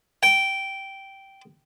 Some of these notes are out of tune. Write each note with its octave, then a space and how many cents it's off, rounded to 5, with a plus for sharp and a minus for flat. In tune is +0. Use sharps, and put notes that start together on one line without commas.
G5 -10